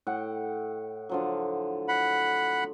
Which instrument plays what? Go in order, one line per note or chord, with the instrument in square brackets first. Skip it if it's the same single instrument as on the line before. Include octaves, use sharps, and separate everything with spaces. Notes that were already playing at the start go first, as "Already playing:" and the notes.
[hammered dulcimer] A2 F#5 G5
D3 F3 F#3
[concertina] F#5 B5